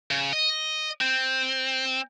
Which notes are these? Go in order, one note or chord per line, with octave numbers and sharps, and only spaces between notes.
C#3
D#5
C4